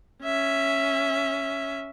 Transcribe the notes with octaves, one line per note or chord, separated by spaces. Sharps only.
C#4 E5